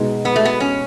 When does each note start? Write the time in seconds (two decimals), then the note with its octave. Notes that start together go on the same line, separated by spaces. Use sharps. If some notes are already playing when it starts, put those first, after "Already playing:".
Already playing: B2 G#3 D#4
0.25 B3
0.36 A3
0.45 B3
0.60 C#4